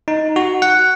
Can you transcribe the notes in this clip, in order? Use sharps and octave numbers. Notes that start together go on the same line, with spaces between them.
D#4
F#4
F#5